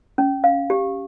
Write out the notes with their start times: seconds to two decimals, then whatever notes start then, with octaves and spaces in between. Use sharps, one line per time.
0.18 C#4
0.44 F5
0.70 G4